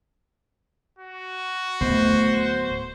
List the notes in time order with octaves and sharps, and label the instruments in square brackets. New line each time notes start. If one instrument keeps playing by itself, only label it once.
[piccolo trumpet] F#4
[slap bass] D1 A2 B3 [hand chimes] A3 [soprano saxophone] C5